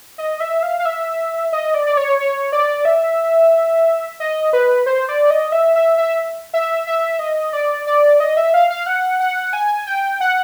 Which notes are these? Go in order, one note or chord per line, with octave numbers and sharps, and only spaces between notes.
D#5
E5
F5
F5
E5
D#5
D5
D5
C#5
C#5
D5
E5
D#5
B4
C5
D5
D#5
E5
E5
E5
E5
E5
D#5
D5
D5
D#5
E5
F5
F5
F#5
F#5
G#5
G5
F#5